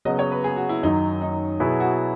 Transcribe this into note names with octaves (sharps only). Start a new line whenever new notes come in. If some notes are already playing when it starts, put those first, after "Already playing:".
C#3 F#3 B3 D#5
C#5
B4
G#4
F#4
E4
F#2 D#3 F#3 D#4
D#4
B2 F#3 B3 E4 G#4
F#4